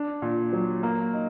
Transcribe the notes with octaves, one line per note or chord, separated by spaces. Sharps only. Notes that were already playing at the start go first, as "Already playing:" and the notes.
Already playing: D4
A#2
F#3
A#3
D#4